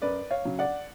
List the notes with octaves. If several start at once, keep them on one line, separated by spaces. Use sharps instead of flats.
F#2 B4 D5
C#5 F5
C#3 F#3
D5 F#5